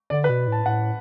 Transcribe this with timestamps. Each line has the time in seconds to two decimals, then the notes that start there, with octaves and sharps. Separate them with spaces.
0.10 D3 D5
0.24 B4
0.29 B2
0.47 A2 A5
0.66 A2 F#5